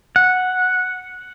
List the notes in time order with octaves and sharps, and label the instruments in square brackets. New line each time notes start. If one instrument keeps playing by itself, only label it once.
[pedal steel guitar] F#5